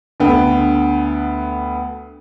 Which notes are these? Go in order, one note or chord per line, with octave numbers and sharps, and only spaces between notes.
D2 D3 B3 G5